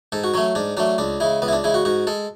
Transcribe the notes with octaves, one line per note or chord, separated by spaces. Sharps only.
G#2 A4
F#4
F#3 A3 C#4
G#2 D4
F#3 A3 D4
C#2 D4
C#3 G#3 E4
C#2 B3
E4
D4
C#3 G#3 E4
F#4
G#2 F#4
G#3 A4